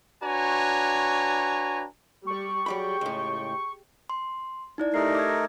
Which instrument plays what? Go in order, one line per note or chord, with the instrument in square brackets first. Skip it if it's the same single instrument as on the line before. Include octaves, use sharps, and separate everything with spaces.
[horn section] D4 F#4 B4 C#5 G#5 A#5
[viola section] G3 G4 D5 [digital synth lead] C#6
[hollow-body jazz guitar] F#3 G3 B5 [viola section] G4 G#4 G5
[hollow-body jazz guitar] C#2 A2
[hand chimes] C6
D#4 E4 D5
[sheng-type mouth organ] A3 D#4 A#4 [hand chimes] G4 C7
[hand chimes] D6 E6 G#6